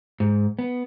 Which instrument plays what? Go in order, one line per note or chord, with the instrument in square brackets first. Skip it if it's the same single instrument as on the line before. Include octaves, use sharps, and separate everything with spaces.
[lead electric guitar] G#2
B3